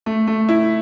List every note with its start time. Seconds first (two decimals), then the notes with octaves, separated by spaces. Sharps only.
0.06 A3
0.27 A3
0.49 E4